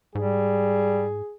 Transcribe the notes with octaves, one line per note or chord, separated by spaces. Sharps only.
G#2 G3 G#4